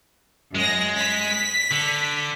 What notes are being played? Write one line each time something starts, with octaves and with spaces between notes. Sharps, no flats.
F#2 G#3 A#6
B6
D3